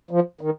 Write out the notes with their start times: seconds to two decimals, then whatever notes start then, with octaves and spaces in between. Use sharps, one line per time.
0.11 F3
0.41 D#3